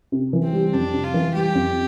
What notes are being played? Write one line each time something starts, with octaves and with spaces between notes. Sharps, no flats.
C3
E3
C4
G3
F2 D4
C3
F4
E3
G3 G4
F2